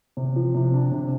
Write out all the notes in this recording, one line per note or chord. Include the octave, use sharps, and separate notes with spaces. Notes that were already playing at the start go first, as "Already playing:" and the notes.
C3
F3
C3
D4
C3